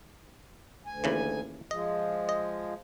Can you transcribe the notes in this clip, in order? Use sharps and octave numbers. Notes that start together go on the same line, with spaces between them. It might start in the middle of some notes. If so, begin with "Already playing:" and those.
D2 G#5
D#2 C#3 E3
F3 G#3 D#5
D#5